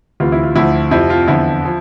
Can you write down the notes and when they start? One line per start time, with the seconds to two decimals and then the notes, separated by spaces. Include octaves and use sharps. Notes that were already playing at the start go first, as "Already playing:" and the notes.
0.20 D2 C3 E3 F4
0.32 E4
0.43 F4
0.56 D2 D3 F3 E4
0.91 F2 C3 F3 E4
1.10 F4
1.28 E2 D3 F3 E4
1.65 F3